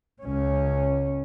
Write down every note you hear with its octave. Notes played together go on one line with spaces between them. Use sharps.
C#2 C#4